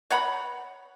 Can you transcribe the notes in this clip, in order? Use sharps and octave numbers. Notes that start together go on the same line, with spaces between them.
C#5 F#5 A#5 B5